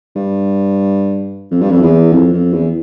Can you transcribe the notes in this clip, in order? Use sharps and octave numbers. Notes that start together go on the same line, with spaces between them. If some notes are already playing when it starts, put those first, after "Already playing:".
G2
F2
G2
F2
E2
F2
F2
E2